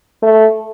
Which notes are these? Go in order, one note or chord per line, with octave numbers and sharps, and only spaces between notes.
A3